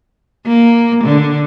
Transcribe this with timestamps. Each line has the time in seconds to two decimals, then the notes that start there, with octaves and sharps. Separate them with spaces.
0.47 A#3
1.04 D3